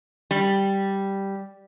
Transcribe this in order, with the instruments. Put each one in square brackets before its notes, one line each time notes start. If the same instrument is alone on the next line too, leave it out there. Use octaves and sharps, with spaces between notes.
[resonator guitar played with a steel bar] G3